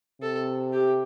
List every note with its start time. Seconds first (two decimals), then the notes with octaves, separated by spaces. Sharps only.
0.21 C3 A4
0.73 G4